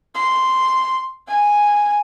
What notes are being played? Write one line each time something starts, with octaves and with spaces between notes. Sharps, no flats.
C6
G#5